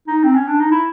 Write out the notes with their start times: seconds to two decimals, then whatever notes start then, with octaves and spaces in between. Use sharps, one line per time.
0.07 D#4
0.24 C4
0.36 C#4
0.48 D4
0.60 D#4
0.71 E4